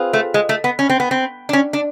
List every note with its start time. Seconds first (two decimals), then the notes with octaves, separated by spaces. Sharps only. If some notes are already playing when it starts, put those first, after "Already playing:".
Already playing: C4 F4 G#4 B4
0.13 A3
0.34 G#3
0.49 A3
0.64 B3
0.79 C#4
0.90 C4
1.00 B3
1.11 C4
1.49 D4
1.53 C#4
1.73 D4